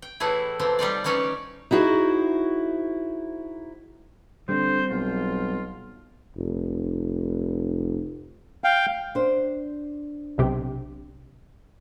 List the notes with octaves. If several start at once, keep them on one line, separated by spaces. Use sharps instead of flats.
G5
A2 E3 A3 E4 G#4
C3 E3 F3 C4
G3 D#4 F4 D5
E3 G3 C#4 D#4 C#5 D5
D#4 E4 F#4 G#4 C5
D3 G3 C4 C5
B1 F4
F1
F5 G5
D4 C5
B1 C3 G4